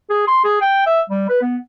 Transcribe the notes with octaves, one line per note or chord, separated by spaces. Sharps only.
G#4
C6
G#4
G5
E5
G3
B4
B3